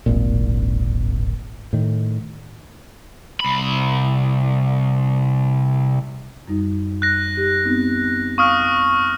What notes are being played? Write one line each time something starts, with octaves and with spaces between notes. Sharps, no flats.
D1 G#1 A#2
A2 D#3
C2 B5
F#2 G3 D#4
F#6 A#6
G4
B3 C4 D#4
F5 C#6 D#6 F6